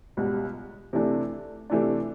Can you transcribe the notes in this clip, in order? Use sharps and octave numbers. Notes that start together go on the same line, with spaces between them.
C#2 B2 G3
C3 E3 A3 D4
C3 E3 A3 D4